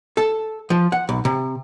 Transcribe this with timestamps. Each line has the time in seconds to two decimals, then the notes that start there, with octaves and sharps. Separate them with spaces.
0.17 A4
0.70 F3
0.92 F#5
1.09 B1
1.25 C3